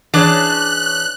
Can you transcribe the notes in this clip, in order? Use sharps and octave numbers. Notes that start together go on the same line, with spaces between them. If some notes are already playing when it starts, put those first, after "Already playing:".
E3 C#4 D4 G#4 F#6 A6